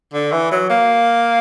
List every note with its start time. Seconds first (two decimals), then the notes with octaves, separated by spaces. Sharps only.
0.14 D3
0.32 E3
0.51 F#3
0.70 A#3